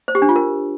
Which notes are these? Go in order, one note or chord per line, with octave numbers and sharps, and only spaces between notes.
C5
G4
D4
F4
A#4